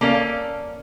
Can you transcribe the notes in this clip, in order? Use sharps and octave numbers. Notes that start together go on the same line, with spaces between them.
A#3 C#4 A4 D5 F5